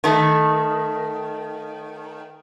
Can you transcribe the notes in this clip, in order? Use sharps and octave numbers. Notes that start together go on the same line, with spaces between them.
D#3 A3